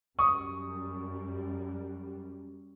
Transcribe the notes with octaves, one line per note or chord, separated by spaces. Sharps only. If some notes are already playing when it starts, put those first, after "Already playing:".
F#2 G3 C#6 D#6